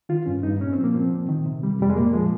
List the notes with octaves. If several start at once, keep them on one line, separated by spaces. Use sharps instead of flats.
D#3 F4
G2 C#4
G2 D#4
A#2 C#4
F3 C4
A#3
F3 C4
A#2
D#3
C3
G3
F2 G3
G#3
A#2 A#3
F3 G#3